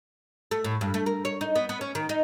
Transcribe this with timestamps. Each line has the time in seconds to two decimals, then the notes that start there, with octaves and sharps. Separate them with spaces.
0.51 A3
0.64 A2
0.81 G2
0.94 A3
1.06 A#4
1.25 C#5
1.41 D#4
1.56 B3
1.69 B3
1.81 C#4
1.95 D#3
2.09 D#4